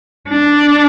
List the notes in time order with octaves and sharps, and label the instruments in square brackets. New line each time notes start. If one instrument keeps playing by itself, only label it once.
[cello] D4